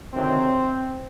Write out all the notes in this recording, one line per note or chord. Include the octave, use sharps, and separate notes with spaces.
D2 C3 D#3 F#3 C4